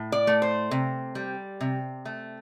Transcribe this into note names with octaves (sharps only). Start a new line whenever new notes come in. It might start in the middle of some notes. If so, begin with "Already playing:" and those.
Already playing: A2
D5
A3
C5
C3
G3
C3
A3